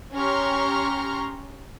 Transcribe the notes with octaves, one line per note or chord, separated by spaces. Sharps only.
C#4 G4 A#5 C6 C#6 F6